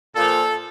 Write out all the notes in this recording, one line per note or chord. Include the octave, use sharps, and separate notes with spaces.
A#2 F3 A4